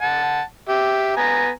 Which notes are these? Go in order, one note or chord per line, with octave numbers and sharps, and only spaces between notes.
F#5 A5
G4 E5
B3 G#5 A#5